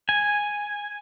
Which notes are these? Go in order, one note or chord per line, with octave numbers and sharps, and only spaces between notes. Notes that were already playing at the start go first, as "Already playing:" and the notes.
G#5